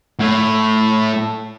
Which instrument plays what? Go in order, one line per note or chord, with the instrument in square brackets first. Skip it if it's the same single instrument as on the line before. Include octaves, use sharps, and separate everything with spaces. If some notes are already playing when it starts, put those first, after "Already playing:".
[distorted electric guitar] A2